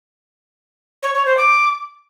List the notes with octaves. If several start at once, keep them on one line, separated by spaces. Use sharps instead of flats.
C#5
C#5
C5
D6